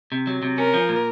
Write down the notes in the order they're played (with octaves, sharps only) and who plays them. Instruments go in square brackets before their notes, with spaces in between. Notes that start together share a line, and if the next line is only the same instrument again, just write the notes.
[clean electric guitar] C3
F#3
C3
[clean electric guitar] C#4 [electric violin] A#4
[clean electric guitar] F3
A#2